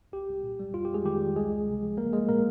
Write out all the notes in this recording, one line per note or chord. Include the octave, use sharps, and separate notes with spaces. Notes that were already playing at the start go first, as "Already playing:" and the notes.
C2 G4
C2
A#2
G3
F2 F4
G4
F2 G#3 G#4
D#3 G4
G3
C#2 G#3 G#4
C#2
C3
F3
A#1 A#3 A#4
A#1 G#3 G#4
A#2 A#3 A#4